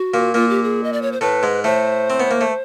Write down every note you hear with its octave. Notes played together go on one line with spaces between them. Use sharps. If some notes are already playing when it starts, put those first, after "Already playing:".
Already playing: F#4
A#2 A#3
A#2 A#3 F4
G4
G#4
D#5
D5
C#5
C5
A2 A3 B4
G#2 G#3
A2 A3 C5
C4
B3
A#3
A3